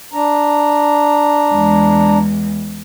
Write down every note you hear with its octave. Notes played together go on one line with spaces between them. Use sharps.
D4 A#5
E2 G#3